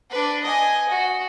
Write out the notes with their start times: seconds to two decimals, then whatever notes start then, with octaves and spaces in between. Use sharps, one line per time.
0.10 D4 B4
0.43 D#5 G#5
0.89 F#4